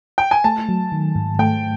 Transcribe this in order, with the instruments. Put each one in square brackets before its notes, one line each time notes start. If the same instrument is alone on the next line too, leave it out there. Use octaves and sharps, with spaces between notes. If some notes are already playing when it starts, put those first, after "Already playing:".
[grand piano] G5
G#5
[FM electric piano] A3 [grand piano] A5
[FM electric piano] F#3
D#3
G#2
[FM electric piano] A3 [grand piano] G5